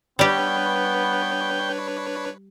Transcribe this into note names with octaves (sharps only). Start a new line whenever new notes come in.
G3 B3 D4 G4 B4 C#5 G5